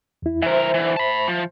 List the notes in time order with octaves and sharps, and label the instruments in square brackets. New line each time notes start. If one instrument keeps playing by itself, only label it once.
[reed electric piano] E2 E4
[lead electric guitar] E3 A#4 [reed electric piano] C5 E5
[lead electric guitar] D3 E3
A5 B5
F3